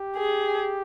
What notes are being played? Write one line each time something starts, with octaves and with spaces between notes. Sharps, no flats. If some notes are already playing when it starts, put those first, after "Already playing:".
Already playing: G4
G#4